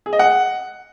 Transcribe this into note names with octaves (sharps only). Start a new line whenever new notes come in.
G#4
D#5
F#5